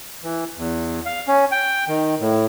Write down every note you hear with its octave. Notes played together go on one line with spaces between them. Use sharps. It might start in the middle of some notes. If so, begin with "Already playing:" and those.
E3
E2
F5
C#4
G5
D#3
A2